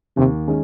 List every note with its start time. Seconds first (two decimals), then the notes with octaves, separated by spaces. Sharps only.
0.17 D#2 C3
0.48 D#3 G#3 C#4 G#4